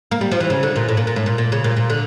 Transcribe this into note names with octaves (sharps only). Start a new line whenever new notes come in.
A#3
G3
F3
E3
C#3
D3
A#2
A2
A#2
A#2
A2
A#2
A#2
C#3
A#2
A#2
D3